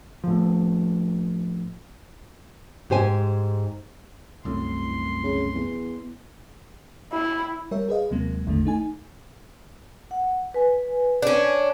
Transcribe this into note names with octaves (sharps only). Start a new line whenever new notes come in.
A2 F3
G#2 G4 C5 G#5
C2 F#2 A2 C6
C#3
E2
E4
G3 A#4 C#5 E5
G#4 B4 D#5 F5
D#2 C3 F#3 G#3 A#3
A1 E2 D3 D#3 A3
A3 D#4 G#5
F#5
B4 G#5
C#4 D4